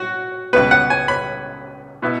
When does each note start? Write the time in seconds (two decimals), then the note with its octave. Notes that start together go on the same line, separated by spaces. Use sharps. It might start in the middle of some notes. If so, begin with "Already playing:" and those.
Already playing: F#4
0.53 C#2 B2 B3 B4
0.71 F#5
0.90 G#5
1.08 B5
2.02 B2 B3 E4